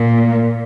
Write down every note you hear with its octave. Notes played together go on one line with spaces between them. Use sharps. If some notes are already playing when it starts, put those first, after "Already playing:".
Already playing: A#2